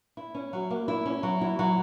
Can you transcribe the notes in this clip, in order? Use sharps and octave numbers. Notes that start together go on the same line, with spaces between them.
E4
C#4
F#3
A#3
E4
C#4
F#3
E4
F#3